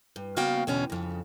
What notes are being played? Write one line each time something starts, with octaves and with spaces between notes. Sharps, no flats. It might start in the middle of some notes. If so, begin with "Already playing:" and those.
G2
C#3 A#3 B3 F#4 F5 G5
E2 B2 D3 C#4
F2 C#3